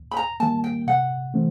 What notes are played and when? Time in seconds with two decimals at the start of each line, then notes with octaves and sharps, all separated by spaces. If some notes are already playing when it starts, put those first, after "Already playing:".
Already playing: D#2
0.11 B5
0.17 A#5
0.40 D#3 G3 A#3 A5
0.64 G5
0.87 C3 F#5
1.34 E3 A3 C4